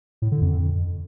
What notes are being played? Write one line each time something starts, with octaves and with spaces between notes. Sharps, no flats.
A2
D3
F2